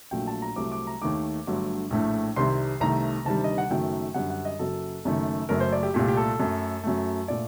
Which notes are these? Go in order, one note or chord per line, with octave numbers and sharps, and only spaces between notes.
A#1 A#2 F#3 A3 G5
A5
A#5
C2 C3 F#3 A3 D6
D6
A#5
D#2 D#3 A3 D6
G1 G2 D3 F#3 A3
A#1 A2 A3
C2 C3 D#3 G3 C6
C2 C3 D#3 A3 A#5
D2 C3 D#3 G3 A5
D#5
F#5
F#1 F#2 D#3 F#3 A3 G5
F#2 D3 G3 F#5
F#5
D#5
F#1 F#2 F#3 A4
F#1 F#2 D#3 A3
F#1 F#2 F#3 A3 A#4
C5
D5
G4
C2 A#2 A3 G4
G4
A4
F#2 F#3 A3
F#2 F#3 A3
A#2 A3 D5